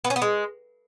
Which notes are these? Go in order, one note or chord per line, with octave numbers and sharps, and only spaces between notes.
B3
C#4
B3
G#3